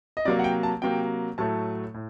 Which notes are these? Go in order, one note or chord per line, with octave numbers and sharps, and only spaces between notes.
D#5
C3 F#3 A#3 D5
F#5
G5
A5
C3 F#3 A#3 G5
A2 F#3 A3 A5
A2